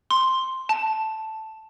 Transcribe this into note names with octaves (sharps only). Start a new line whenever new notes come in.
C6
A5